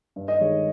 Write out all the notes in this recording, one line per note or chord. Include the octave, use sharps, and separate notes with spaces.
G2
D#5
D#3 G#3 C#5